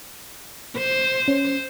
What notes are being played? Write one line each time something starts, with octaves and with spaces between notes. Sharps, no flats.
C5
C#4